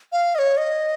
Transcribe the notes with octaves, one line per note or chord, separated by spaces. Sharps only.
F5
D#5
C#5
D#5